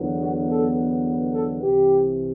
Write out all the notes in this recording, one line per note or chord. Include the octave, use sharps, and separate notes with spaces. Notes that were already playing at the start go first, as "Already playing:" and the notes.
Already playing: E2 D3 F#3 B3
F#4
A4
B4
A4
C2 C3 E3 G4